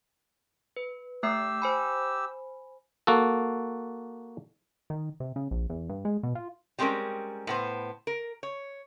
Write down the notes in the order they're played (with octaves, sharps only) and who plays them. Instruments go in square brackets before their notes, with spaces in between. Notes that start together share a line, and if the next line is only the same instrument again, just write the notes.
[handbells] B4
[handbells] A3 E5 C7 [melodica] G4 E6
[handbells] C5 G#5 B5
[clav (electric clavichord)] A#3 F#4 A4
[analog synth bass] D#3
C3
C#3
A#1
E2
G2
G#3
B2
F4
[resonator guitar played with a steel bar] G3 G#3 C4 C#4 A#4
A2 B3 C5
A#4
C#5